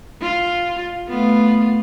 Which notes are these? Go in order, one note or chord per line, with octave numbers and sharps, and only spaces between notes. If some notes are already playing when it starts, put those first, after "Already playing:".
F4
A3 B3 F4